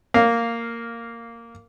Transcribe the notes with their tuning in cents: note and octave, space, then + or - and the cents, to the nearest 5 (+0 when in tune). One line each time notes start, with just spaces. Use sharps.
A#3 -10 F5 +0